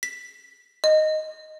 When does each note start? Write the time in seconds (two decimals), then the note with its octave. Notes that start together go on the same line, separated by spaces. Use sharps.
0.03 B6
0.84 D#5